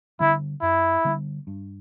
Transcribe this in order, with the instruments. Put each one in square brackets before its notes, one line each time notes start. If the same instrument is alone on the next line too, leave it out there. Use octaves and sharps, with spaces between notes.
[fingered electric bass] D3 G3 B3 [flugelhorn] E4
[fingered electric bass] F#2 [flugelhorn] E4
[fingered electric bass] D3 G3 B3
G2